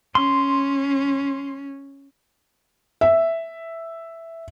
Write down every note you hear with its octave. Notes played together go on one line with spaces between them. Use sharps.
C#4 C6
E5